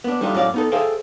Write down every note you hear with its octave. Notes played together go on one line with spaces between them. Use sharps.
B3 D4
G3 A3 D4 D#4 F4
F#2 A2 D5 F5
B3 D#4 A4
G#4 A4 C5 E5 F5 G5